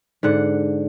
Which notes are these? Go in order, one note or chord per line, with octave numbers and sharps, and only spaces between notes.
G#2 D3 F#5